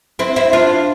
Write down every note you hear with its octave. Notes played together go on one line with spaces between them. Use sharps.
C4 E4
C4 E4
D4 F4